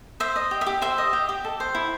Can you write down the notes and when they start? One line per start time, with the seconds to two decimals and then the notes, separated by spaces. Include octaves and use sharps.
0.20 C5 E5
0.36 D#5
0.51 G4
0.61 E5
0.67 G4
0.82 C5 E5
0.98 D#5
1.13 G4
1.29 G4
1.45 A4
1.60 C5
1.75 E4